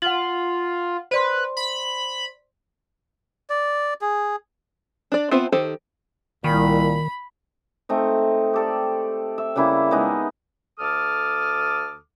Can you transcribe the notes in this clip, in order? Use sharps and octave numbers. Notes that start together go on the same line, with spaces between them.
F4 F#5 F#7
B4 C5 D5 C6
B5
D5
G#4
D4 D5
B3 C4 F4 C5 E5
D#3 G4 A4 C5
C2 A#2 D#3 B5
A3 C4 D#4
G4 A4 D5
E5
C#3 G3 A#3 E4
G#3 B3 D#4
D2 A4 D6 D#6 F6